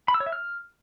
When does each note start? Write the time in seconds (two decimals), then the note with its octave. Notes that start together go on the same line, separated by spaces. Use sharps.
0.08 B5
0.14 E6
0.20 C#5
0.26 E5
0.32 F6